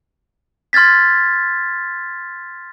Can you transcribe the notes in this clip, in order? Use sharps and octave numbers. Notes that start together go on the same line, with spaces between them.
C6 F6 G#6 A6 B6